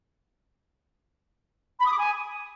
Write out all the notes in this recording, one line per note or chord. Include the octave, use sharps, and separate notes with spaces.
B5
D#6
D6
G#5